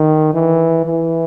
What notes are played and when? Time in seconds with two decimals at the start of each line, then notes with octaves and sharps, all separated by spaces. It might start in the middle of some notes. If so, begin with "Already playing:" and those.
Already playing: D#3
0.34 E3
0.85 E3